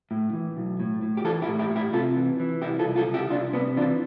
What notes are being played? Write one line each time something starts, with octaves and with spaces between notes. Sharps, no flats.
A2
E3
B1
A2
A2
G4
E3 F4 A4
E4 G4
A2
E4 G4
A2
E4 G4
C3 F4 A4
E3
E3
C2 E4 G4
F4 A4
C2
F4 A4
C2
E4 G4
C2 D4 F4
C3 B3 D4
E3 D4 F4